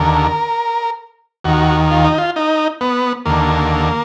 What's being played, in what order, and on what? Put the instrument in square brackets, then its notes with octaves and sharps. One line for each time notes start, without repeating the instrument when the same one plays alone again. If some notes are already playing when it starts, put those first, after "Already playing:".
Already playing: [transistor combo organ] D#2 D3 A#4
D#2 D#3 F#4
F4
D#4
F4
D#4
B3
D#2 D3 A#3